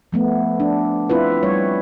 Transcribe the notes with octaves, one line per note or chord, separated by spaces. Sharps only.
F3 A3 B3
D4
C4 E4 F4 B4
G3 C#5